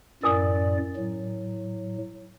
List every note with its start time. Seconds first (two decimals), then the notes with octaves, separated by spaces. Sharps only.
0.23 F#2 A2 A#4 D5 G#5 D#6
0.96 A2 F#3